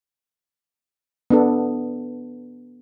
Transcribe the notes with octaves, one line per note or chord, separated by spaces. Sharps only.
B3 D4 A4